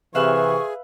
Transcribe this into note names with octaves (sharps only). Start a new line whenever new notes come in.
C3 E3 G#4 B4 E5 F5 C#6